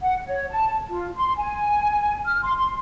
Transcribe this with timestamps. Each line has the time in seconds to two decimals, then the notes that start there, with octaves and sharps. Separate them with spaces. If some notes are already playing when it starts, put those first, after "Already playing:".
0.01 F#5
0.26 C#5
0.50 A5
0.88 F4
1.15 C6
1.37 G#5
2.25 F6
2.42 C6
2.55 C6